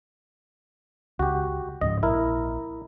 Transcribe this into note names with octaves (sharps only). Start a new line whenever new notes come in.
C#2 F#4 G4
C#2 G#2 F3 D#5
A#1 E4 A#4